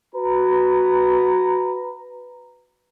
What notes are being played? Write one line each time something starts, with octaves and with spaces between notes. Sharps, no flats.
F#4 B4 A#5